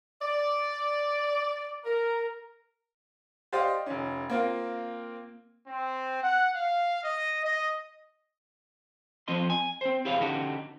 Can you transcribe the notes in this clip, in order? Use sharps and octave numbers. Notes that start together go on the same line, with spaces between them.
D5
A#4
G4 C5 D5 D#5 F5 G5
F1 C#4
A#3 C4 F4 A#4
C4
F#5
F5
D#5
D#5
F3 C4 F4 D#5 C6
G#5
C4 C5
E4 G4 G#4 B4 C#5 F5
D3 C#4 D#4 F#4 G4